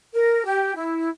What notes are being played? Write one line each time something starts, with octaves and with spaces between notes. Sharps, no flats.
A#4
G4
E4